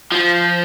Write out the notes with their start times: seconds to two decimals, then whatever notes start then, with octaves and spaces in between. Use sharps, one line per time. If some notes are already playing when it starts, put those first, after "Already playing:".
0.12 F3